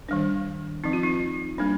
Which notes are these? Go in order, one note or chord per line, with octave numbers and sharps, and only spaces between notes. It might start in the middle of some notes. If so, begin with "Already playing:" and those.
D#3 G3 D4
F3 C4 D#4
F4
D#4
G3 A#3 D4